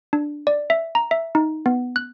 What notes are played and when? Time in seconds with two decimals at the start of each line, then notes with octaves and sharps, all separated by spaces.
0.13 D4
0.47 D5
0.70 E5
0.95 A#5
1.11 E5
1.35 D#4
1.66 B3
1.96 F#6